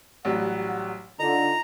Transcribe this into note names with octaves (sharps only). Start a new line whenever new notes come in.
A1 F#3 G3 F#5
D3 D#4 F4 A#5